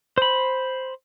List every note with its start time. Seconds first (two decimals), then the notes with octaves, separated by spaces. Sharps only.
0.18 C5 B5